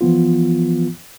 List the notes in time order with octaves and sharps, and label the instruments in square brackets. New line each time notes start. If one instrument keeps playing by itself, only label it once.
[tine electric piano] E3 F3 B3 F4